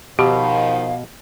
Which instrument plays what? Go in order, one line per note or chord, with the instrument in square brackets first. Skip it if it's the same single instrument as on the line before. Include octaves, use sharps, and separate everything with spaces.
[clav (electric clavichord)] B2 [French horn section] D#3 F3 [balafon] G4 [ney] F5